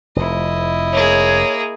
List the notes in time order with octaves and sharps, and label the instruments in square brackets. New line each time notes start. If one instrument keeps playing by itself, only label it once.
[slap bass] F1 F2 [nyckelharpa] E4 D#5
[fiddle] A#3 G#4 [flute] C#5